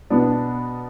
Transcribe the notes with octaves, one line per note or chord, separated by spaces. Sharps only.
B2 B3 D4